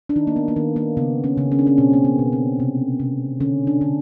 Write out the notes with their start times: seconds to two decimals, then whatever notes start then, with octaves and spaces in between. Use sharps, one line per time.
0.09 D4
0.16 D#3 D#4
0.27 A#3
0.36 B3
0.48 A#3
0.56 D#3 B3
0.76 A#3
0.97 C#3 B3
1.24 C#4
1.38 C#3
1.52 C#4
1.59 D4
1.67 C#4
1.78 B2 C4
1.93 A#3
2.04 B3
2.19 B2
2.32 C4
2.60 C3
3.00 C3
3.40 D3 C#4
3.67 D4
3.81 D3